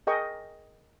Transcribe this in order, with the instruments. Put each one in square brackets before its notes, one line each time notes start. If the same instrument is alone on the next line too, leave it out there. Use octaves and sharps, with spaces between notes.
[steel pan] G#4 A#4 D#5 G5 C#6